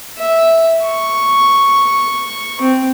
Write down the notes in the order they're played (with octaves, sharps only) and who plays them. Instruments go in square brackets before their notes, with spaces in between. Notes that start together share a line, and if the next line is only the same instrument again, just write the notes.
[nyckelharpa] E5
C#6
C4